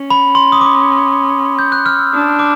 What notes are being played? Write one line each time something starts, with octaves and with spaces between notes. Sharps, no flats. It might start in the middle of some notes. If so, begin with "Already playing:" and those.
Already playing: C#4
B5
C6
D#6
D6
G6
F#6
F6
E6
D4 D#6
D6